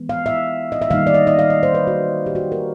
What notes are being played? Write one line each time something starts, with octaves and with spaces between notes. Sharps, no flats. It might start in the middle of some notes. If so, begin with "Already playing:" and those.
Already playing: E3 G#3 B3
F5
E5
D#5
E5
D#3 G3 A#3 D#4 F5
D5
D#5
D#5
F5
D#5
C5
B4
F#4
G4
F#4
A#4